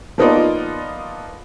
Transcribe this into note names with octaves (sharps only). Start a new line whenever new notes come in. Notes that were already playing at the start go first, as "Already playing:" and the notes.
F3 A#3 B3 D#4 F4 D5